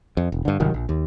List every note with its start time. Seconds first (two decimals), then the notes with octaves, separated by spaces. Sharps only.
0.17 F2
0.32 E1
0.45 G2 D3
0.60 G1 C3 D#3 F#3
0.74 A#1
0.89 D#2